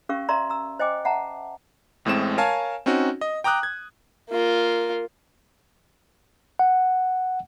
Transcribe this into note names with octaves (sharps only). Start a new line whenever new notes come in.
C#4 G4 A#4 F5 C#6
A#4 D5 E5 A#5 C6
A#5 E6
C5 D#5 G5 G#5 D6
E5 F#5 A5 A#5
A1 A2 G#3 C4 E7
A#4 C#5 F5 G#5 A5
C4 C#4 D#4 F#4
D#5
G5 A#5 D6 D#6 F#6
G#6
A#3 F4
F#5